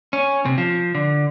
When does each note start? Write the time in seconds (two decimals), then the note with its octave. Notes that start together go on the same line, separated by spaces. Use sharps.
0.13 C#4
0.45 C3
0.58 F3
0.95 D3